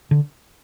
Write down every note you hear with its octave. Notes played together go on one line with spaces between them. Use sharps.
D3